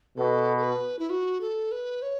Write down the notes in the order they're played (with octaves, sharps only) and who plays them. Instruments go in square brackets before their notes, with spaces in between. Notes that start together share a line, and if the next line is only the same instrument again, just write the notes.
[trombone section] B2 [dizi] A4
[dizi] A4
B4
E4
F#4
A4
B4
C#5